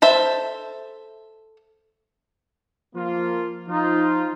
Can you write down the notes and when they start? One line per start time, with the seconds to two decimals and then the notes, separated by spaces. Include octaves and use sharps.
0.02 A4 C5 E5
2.95 F3 A#3 F4
3.68 F3 D#4 F4